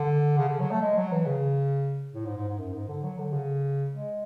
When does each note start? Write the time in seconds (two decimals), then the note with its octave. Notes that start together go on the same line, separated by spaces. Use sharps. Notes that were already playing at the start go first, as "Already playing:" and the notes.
Already playing: D3
0.38 C#3
0.49 D3
0.60 F#3
0.71 A3
0.82 G#3
0.97 F#3
1.12 E3
1.26 C#3
2.15 A2
2.25 G#2
2.37 G#2
2.48 G#2
2.59 F#2
2.73 G#2
2.88 D3
3.03 F#3
3.18 D3
3.33 C#3
3.92 G#3